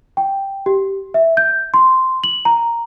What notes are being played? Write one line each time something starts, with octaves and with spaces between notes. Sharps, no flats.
G5
G4
E5
G6
C6
F#7
A#5